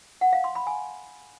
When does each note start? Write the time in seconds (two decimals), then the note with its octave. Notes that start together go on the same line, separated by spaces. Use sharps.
0.21 F#5
0.33 F5
0.44 C6
0.55 B5
0.67 G#5